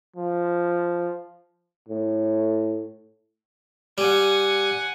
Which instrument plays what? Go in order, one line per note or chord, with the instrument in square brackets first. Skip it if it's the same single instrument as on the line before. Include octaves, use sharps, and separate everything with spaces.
[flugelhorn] F3
[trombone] A2
[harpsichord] G3 [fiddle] F#5 G#5